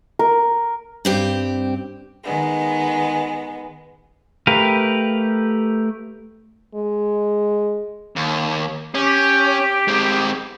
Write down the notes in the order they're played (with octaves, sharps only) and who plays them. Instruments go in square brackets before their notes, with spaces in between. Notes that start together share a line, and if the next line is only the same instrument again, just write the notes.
[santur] A#4
[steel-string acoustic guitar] G2 C4 G4
[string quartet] D#3 G#3 B3
[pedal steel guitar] A3 G4 A#4 B4 F5
[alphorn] G#3
[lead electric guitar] D#2
[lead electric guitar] C#4 [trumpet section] G4
[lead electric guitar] G#3 C4